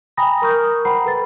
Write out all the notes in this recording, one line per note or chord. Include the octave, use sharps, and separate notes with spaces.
G5 G#5 A#5 B5 D#6 A#6
A#4 A#5 C#6 D#6 F6 G6
C5 F#5 G5 A#5 B5 C7
A4 B4 B5 A6